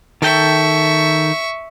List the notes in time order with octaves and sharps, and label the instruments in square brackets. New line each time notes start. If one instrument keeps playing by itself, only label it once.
[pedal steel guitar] D#3 A4 G5 [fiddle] E5 C#6